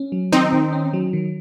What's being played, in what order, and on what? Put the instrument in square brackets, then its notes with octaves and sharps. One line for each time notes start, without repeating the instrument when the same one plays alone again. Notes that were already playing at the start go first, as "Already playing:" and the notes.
Already playing: [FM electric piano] C#4
F#3
[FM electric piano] D#3 [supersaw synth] C4 D#4
[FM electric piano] D#3
C#4
F#3
D#3